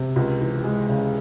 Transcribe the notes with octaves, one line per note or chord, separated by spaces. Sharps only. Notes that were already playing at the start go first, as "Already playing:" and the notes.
Already playing: C3
C#2
E3
G#3
C#3